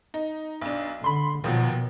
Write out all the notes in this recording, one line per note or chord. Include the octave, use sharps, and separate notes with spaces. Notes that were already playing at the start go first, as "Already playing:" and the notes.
D#4
B1 D4
D3 B5 C6
D#2 B2 F3 F#3